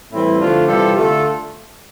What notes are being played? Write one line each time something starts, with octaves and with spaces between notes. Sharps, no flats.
A2 E3 G3 C4 E4
D3 F3 A3 D4 F4
C3 E3 G3 F4 A4
D3 A3 F4 A4